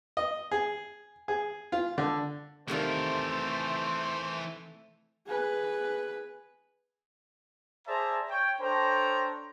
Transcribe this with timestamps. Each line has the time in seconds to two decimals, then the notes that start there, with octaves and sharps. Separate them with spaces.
0.17 D#5
0.51 G#4
1.28 G#4
1.72 F4
1.98 D3
2.68 C3 D#3 E3 A3 F4 A#4 C5
5.27 G#4 B4
7.88 G#4 C5 D5 E5 A5 A#5
8.30 C#5 G5
8.60 D4 A4 C5 C#5 G5 A#5